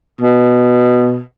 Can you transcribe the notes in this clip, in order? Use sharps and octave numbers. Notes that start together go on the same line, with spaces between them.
B2